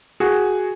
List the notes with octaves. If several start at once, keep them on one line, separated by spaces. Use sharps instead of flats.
F#4 G#4